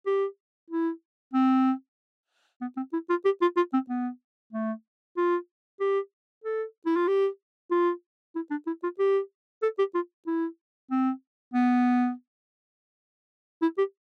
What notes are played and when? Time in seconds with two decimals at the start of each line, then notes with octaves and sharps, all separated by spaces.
0.06 G4
0.70 E4
1.34 C4
2.61 B3
2.77 C4
2.93 E4
3.10 F4
3.25 G4
3.42 F4
3.57 F4
3.73 C4
3.89 B3
4.53 A3
5.17 F4
5.80 G4
6.44 A4
6.86 E4
6.97 F4
7.08 G4
7.71 F4
8.36 E4
8.51 D4
8.67 E4
8.83 F4
8.99 G4
9.62 A4
9.79 G4
9.95 F4
10.27 E4
10.91 C4
11.54 B3
13.62 E4
13.78 G4